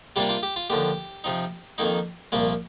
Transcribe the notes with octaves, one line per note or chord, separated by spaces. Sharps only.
C3 G3 A#3 D4 F4 G4
F4
G4
F4
D#2 D3 F3 G4
C3 F3 C4 D#4
F2 D#3 A#3 D#4
C2 A#2 F3 A#3